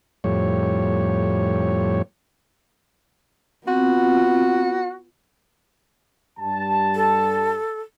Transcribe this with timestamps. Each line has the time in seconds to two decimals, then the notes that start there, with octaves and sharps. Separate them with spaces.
0.24 F2 A2 G3 C#5
3.68 B3 C4 F4 F#4
6.40 G2 G3 A5
6.95 A4